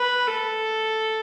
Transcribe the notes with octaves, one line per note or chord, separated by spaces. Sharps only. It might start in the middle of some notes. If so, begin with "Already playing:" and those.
Already playing: B4
A4